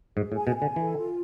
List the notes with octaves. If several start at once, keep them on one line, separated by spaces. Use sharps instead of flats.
G#2 G#4
A2
G#5
B2
G#5
D3
E3 A4
F4